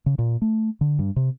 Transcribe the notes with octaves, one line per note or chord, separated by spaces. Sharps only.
C#3
A#2
A3
D3
G2
C3